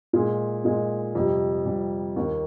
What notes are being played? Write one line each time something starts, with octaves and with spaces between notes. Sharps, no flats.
A#2 G#3 D#4 G#4
A#2 G#3 D#4 G#4
F2 C3 G3
F2 C3 G3
D#2 D#3 A#3